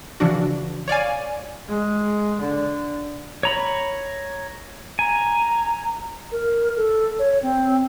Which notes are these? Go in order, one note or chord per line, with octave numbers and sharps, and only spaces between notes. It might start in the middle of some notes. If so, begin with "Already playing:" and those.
C#3 E3 F3 D4 F#4
C#5 D5 F5 G#5
G#3
D3
C#5 A#5 B5
G#5 A#5
A#4
A4
C#5
C4